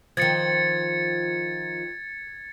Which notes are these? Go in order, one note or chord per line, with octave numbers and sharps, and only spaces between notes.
D#3 F3 G#6 A6 C#7